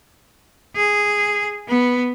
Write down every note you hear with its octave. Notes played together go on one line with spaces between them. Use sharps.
G#4
B3